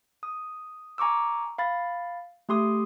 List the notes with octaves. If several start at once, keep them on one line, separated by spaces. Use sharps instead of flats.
D#6
G#5 A#5 C#6 D6 E6
F5 B5 A6
A3 G4 C6 D#6